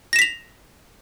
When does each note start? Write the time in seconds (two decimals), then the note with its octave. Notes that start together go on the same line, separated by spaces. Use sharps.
0.13 A#6
0.16 E7
0.19 B6
0.22 F7